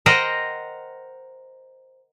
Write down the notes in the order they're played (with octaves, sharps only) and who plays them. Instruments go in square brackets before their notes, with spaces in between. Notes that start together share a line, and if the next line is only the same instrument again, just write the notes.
[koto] A#4 C5 D#5 F#5 G5